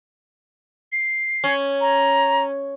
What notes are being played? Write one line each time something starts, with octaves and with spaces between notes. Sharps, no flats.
C7
C#4
A#5